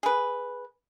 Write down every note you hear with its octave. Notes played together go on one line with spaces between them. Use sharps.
G#4 B4